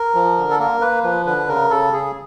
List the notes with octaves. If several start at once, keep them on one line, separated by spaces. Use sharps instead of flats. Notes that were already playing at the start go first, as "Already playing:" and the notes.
Already playing: A#4
F3
D3
A4
A#3 A#4
A#3 B4
F3 B4
D3 B4
C#3 A#4
C#3 A4
C#3 G#4